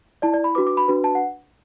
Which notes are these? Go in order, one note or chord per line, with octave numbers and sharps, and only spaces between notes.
E4 D5 A5
D5
B5
D4 F#4 B4 D6
D6
B5
D4 F#4 B4
A5
F#5